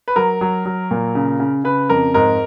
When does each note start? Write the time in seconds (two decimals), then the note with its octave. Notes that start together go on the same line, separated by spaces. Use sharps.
0.08 B4
0.16 F#3 A#4
0.41 F#3
0.65 F#3
0.91 A#2
1.15 C#3
1.40 C#3
1.64 C#3 B4
1.89 F2 A#4
2.14 G#2 A#4